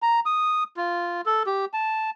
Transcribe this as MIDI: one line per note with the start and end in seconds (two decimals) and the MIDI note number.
0.02 0.20 82
0.26 0.64 87
0.77 1.21 65
1.26 1.43 69
1.46 1.65 67
1.73 2.10 81